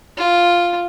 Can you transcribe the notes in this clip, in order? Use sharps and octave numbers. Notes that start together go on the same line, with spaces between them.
F4